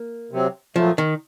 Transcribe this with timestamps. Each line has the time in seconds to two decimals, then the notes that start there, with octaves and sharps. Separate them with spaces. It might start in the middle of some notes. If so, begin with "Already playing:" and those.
Already playing: A#3
0.31 C3 F#3 C4
0.76 A#2 F3 F#3 A3
0.98 D#3